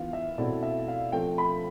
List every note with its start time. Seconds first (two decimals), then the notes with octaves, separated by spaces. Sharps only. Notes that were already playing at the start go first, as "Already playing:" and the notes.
Already playing: E3 B3 F4 F5
0.13 E5
0.38 B2 A3 C4 E4 D5
0.63 E5
0.88 F5
1.12 F3 A3 C4 G5
1.38 B5